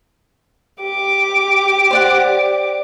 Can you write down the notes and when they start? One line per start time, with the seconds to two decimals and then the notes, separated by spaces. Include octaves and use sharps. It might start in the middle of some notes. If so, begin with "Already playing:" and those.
0.81 G4 D6
1.91 C5 D5 F#5